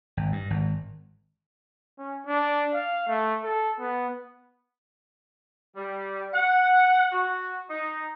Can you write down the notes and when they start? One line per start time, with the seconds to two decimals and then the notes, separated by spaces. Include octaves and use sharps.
0.17 G#1
0.32 G2
0.50 G#1
1.98 C#4
2.27 D4
2.74 F5
3.08 A3
3.44 A4
3.79 B3
5.76 G3
6.34 F#5
7.12 F#4
7.70 D#4